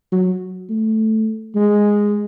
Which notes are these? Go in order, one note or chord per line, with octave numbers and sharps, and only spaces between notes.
F#3
A3
G#3